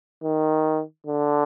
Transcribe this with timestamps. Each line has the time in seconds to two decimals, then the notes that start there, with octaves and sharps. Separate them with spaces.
0.24 D#3
1.06 D3